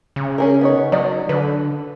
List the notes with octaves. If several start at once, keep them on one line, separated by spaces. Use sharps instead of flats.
C#3
C#4 G#4 A#4
B3 D#4 C#5
F#3 D#4 D5 D#5
D3 B4